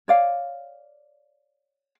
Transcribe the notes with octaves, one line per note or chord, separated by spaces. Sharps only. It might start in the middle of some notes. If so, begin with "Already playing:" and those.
C#5 D5 F5